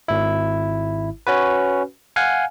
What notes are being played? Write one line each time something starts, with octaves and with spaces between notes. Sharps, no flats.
G#1 E4
C#4 F#4 B4
F5 F#5 G#5